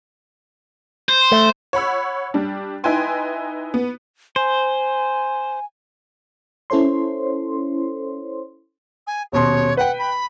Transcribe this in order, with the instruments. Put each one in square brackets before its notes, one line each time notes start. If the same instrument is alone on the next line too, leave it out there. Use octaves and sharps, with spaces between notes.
[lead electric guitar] C5
[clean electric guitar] A3
[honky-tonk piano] C#5 F#5 B5 E6
G3 D4
D#4 E4 B4 G5 G#5 C6
B3
[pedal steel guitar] C5 [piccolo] G#5
[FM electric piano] C#4 E4 A4 C5 C#5 C6
[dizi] G#5
[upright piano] D#1 B2 C6 [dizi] C#5
[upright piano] B4 G5 [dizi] F#5
[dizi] B5